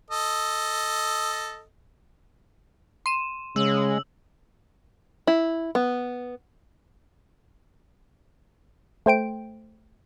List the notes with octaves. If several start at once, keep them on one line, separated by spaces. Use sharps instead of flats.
A4 D#5
C6 D#7 E7
C#3 G#3 E6 F#7
E4
B3
A3 C5 G5 D7